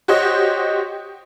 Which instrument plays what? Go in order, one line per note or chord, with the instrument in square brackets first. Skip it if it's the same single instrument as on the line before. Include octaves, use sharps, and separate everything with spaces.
[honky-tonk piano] F#4 G4 C5 C#5 D#5